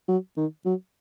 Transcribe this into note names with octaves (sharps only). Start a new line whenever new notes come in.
F#3
D#3
F#3